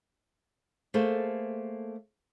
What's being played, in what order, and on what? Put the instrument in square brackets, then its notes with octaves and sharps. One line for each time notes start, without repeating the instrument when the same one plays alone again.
[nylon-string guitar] A3 A#3 G#4 A4 C5